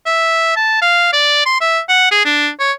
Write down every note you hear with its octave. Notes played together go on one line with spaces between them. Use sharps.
E5
A5
F5
D5
C6
E5
F#5
G#4
D4
C#5